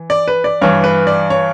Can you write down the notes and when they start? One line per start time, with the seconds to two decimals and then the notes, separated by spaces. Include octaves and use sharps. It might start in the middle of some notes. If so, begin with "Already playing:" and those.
Already playing: E3
0.10 D5
0.28 B4
0.44 D5
0.62 G2 E3 C#5
0.84 B4
1.07 D5
1.30 C#5